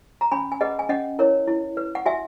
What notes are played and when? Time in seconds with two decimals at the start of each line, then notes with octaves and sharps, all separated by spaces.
0.21 A#5
0.32 C#4 G#5 B5
0.52 G#5
0.61 G#4 B4 D#5 F#5
0.79 G#5
0.89 C#4 D#5 F#5
1.19 E4 A#4 C#5
1.48 E4
1.77 B4
1.95 F#5
2.06 F#4 E5 G#5